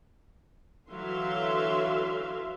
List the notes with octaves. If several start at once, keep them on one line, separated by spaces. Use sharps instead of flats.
D3 E3 F#3 E5 F5 C6